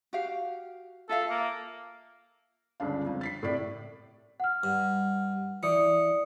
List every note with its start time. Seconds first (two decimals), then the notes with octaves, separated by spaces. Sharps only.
0.13 F#4 G4 F5
1.09 F4 A4 E5 F5
1.30 A#3
2.80 G1 C#2 C#3 D4 F5
3.06 F2
3.21 A6 B6 C7
3.43 A2 C3 D5 B6
4.40 F#5 F6
4.63 G2
5.63 E3 D5 D#6 C#7